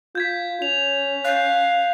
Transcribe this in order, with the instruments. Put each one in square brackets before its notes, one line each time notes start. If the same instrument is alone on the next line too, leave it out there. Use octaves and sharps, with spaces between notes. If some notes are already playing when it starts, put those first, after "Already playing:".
[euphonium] F4 [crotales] G6 G#6 B6
[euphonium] C#4 [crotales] F7
[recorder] F5 [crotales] F#6 G6